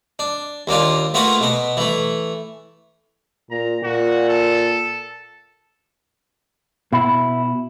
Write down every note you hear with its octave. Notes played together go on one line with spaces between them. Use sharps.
D4
D#2 A#3 D4 F4
A3 A#3 F4 F#4 A4 B4
B2 B3
E3 A3
A#2 A#5
A#2 F#4
A4
B2 E4